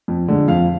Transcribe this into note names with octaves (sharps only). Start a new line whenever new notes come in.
F2
D3 G#3
F2 F5